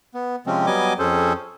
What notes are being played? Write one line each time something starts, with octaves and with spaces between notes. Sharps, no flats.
B3
C3 F3 G#3 C4 C#4
F#3 G3 B3 D#5 G#5 D6
F2 C#4 G#4 A4 C5